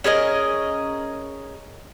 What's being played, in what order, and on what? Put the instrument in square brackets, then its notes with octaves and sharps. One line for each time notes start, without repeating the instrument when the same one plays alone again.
[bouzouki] C#4 G#4 A#4 D#5